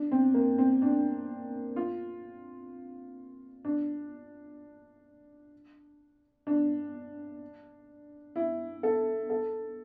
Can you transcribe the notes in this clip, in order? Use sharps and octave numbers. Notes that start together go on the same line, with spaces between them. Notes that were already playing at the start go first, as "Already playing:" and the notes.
Already playing: D4
C4
A#3
C4
D4
F4
D4
D4
E4
A4
A4